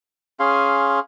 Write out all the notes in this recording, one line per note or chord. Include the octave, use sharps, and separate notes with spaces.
C#4 G#4 F5 C6